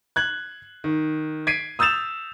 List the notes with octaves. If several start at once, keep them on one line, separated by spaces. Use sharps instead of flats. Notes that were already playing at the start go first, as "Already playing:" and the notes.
F#6 G#6 F#7
D#3
G#6 B6 C7 D7 D#7
D#6 E6 G6 A6 E7 F7